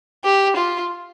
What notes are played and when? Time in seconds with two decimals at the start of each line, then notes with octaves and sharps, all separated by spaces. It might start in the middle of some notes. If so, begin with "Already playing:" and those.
0.24 G4
0.57 F4